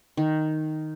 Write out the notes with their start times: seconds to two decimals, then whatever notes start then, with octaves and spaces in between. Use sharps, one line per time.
0.17 D#3